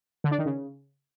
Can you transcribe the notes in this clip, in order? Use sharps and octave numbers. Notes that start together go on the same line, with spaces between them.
D3
D4
D#3
C#3